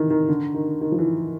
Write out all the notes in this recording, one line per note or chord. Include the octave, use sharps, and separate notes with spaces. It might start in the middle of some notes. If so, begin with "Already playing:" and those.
Already playing: D#3 E3
D#3
D3
D#3
D#3
F3
E3